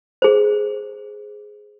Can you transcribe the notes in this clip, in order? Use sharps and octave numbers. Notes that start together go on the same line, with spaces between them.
G#4 C5